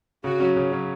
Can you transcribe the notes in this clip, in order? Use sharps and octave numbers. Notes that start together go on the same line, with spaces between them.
C#3 F#4
F#3 C#4
C#3
F#3 C#4